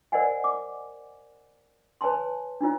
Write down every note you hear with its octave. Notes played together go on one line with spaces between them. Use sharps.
A#4 C5 D5 D#5 F#5 G#5
D6
B4 C#5 G#5 A5 C6
D4 D#4 F4 C#5